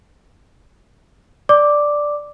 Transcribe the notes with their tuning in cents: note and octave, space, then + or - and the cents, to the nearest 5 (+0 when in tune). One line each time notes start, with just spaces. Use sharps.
D5 +0 D6 +0